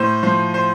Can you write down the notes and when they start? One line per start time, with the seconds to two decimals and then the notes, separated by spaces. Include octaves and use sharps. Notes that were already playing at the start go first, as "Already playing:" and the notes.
Already playing: A2 C5
0.23 F3 C5
0.54 C5